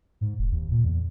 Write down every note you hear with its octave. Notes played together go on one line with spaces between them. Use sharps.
G#2
E1
D#2
A#2
E2